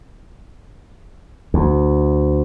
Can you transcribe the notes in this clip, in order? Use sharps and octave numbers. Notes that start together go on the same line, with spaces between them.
D2